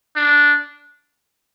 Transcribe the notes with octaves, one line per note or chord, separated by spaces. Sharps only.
D4